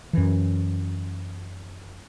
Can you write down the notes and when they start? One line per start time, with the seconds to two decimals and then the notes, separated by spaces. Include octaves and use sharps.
0.13 F#2 E3